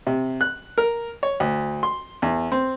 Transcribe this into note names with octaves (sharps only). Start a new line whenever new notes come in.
C3
F#6
A#4
C#5
D2
C6
E2
C4